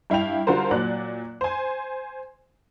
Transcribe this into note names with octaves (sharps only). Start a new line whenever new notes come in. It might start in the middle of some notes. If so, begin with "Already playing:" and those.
G2 E4 F5 G5 F7
D3 G3 F4 F#4 A#4 C5
A#2 F#3 D5 F#6
C5 G#5